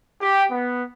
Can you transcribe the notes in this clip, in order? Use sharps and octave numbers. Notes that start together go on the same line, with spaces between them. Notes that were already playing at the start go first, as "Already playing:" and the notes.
G4
B3